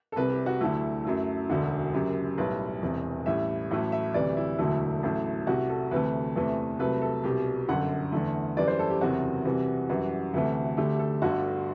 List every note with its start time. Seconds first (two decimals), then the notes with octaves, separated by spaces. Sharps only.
0.12 A4
0.16 C2 C3 G3 B4
0.31 G4
0.46 F#4
0.61 D2 D3 F#3 A3 E4
1.05 F#2 F#3 A3
1.49 E1 D2 D3 F#4
1.93 F#1 F#2 F#3 G4
2.38 B1 A2 G3 B4
2.82 E1 E2 C3
3.26 A1 A2 G3 E5
3.71 A1 A2 F#3 A3
3.92 E5
4.14 D2 C3 E3 G3 D5
4.37 E4
4.58 E1 D2 D3 F#3 A3
5.03 A1 A2 F#3 A3
5.47 C2 C3 G3 F#4
5.69 A4
5.91 D2 C3 E3 A3 B4
6.36 E2 C3 E3 A3
6.79 C2 C3 F#3 A3 B4
7.02 A4
7.24 C2 B2 G3 G4
7.68 G1 F#2 D3 F#5
8.12 E2 D3 A3
8.57 F#2 E3 G3 B4 D5
8.68 C5
8.79 A4
8.90 G4
9.01 F#1 E2 C3 F#3 F#4
9.45 C2 C3 E3 G3
9.89 F#2 E3 G3 F#4
10.34 D2 C3 E3 A3
10.77 D2 D3 A3 G4
10.94 G4
10.99 A4
11.22 G1 G2 D3 F#4